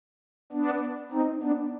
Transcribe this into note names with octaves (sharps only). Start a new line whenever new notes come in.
B3 D4
C4 D#4
B3 D4